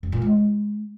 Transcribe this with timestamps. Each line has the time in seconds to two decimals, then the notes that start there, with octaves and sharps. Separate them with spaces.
0.03 F#2
0.12 A#2
0.22 G#3